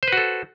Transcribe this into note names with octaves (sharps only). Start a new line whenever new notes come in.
F#4 A4 B4 C5